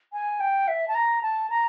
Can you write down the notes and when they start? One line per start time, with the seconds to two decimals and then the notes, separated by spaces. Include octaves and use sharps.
0.13 G#5
0.40 G5
0.68 E5
0.88 A5
0.95 A#5
1.23 A5
1.50 A#5